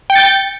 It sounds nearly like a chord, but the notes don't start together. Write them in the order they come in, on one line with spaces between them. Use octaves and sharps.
G5 C#7 A6 G6